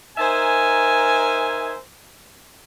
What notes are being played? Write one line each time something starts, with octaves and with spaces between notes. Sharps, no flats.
D#4 A#4 C5 E5 G#5